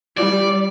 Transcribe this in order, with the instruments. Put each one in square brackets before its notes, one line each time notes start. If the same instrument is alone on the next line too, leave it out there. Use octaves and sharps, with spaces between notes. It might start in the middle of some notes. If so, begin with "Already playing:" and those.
[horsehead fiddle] G3 [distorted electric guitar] D5